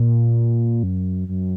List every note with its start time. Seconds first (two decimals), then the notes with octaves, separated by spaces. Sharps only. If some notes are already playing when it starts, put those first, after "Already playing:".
Already playing: A#2
0.83 F#2
1.28 F#2